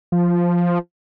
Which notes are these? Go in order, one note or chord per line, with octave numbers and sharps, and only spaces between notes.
F3